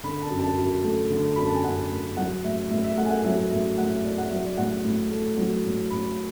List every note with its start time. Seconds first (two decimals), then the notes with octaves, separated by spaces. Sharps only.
0.03 D3 B5
0.22 A5
0.30 F#2
0.39 A5
0.57 F#2
0.84 A3
1.10 D3
1.36 F#2 B5
1.45 A5
1.55 G#5
1.64 F#2 F#5
1.90 A3
2.17 F#3 F#5
2.44 A2 E5
2.70 A2 E5
2.84 E5
2.97 A3 F#5
3.05 G#5
3.10 F#5
3.24 F#3 E5
3.50 A2 E5
3.78 A2 F#5
3.91 E5
4.04 A3 D5
4.18 F#5
4.30 F#3 E5
4.44 D5
4.57 A2 F#5
4.85 A2
5.11 A3
5.37 F#3
5.65 A2
5.90 A2 B5